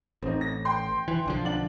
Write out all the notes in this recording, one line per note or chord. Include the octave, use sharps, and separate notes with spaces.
A1 C4 D#4
A#6
G5 C6
E3
B1 D3 F3
D4 F#7